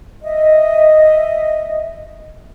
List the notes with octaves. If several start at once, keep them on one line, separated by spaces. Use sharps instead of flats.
D#5 E5